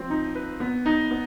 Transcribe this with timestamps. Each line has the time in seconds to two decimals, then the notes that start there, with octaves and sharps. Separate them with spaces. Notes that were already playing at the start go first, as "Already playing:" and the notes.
Already playing: F3 C4
0.10 D#4
0.35 B4
0.60 B3
0.86 D#4
1.11 B3